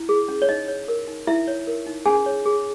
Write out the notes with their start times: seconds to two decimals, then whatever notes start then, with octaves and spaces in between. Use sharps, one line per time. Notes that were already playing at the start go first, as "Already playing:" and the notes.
Already playing: E4
0.09 G#4
0.28 C#4
0.42 C#5
0.49 D#4 D#5
0.68 C#5
0.88 A#4
1.08 D#4
1.27 D#4 E4 E5
1.48 C#5
1.67 A#4
1.86 D#4
2.06 C#4 G#4 G#5
2.26 C#5
2.46 G#4